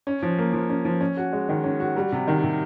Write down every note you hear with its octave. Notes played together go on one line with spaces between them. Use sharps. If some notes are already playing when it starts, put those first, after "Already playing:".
C#4
F3
A#3
F3
C#4
F3
C#4
F#4
G#3
D#3
C#4
F#4
G3
C3
D#3
C3